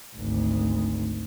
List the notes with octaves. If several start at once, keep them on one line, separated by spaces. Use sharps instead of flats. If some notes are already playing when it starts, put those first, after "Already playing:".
G#1 D2